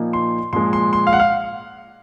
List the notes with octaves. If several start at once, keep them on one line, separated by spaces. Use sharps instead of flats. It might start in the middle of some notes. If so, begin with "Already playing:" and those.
Already playing: A#2 F3 A#3 D#4
C6
A#2 F3 G#3 C6
C6
C6
F5
F#5
F5